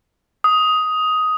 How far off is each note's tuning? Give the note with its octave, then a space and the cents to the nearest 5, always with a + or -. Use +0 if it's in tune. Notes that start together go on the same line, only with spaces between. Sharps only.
D#6 +10